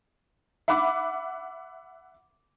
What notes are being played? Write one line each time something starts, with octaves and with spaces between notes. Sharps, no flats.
E5 F#5 B5 D6